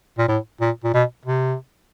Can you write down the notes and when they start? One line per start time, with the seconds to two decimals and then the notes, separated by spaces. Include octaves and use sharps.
0.18 A#2
0.28 A2
0.61 A#2
0.84 A#2
0.94 B2
1.26 C3